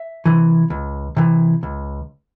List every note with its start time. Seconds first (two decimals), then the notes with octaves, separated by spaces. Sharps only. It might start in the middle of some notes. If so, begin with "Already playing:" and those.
Already playing: E5
0.26 C3 E3
0.70 C#2
1.17 C3 E3
1.63 C#2